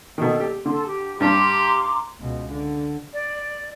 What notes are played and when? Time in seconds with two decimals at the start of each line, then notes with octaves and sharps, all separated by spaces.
0.18 B2 D#3 A4
0.40 G4
0.66 D3 A4 A5 C6
0.85 G4
1.20 G2 G3 G4 A5 A#5 C6 D6
2.19 C#2 B2
2.50 D3
3.14 D5